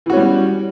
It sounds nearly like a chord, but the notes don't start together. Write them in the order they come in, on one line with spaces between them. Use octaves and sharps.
E3 F#4 C#4 G3